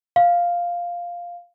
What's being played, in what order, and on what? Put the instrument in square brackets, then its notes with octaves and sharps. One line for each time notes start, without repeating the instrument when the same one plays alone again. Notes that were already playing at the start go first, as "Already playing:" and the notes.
[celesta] F5